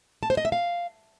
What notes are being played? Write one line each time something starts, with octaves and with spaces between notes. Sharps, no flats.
A5
C5
D#5
E5
F5